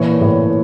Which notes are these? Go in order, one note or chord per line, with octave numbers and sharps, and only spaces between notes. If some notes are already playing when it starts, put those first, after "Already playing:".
Already playing: A#2 E3 C#5
A2